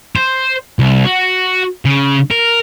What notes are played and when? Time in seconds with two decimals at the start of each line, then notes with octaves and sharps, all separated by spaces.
0.16 C5
0.79 C2
1.04 F#4
1.85 C#3
2.31 A#4